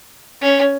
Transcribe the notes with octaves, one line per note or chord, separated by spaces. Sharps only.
C#4